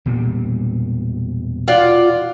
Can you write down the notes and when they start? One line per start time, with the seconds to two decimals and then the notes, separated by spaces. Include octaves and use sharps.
0.06 E1 A#2 G3
1.68 F4 D5 F#5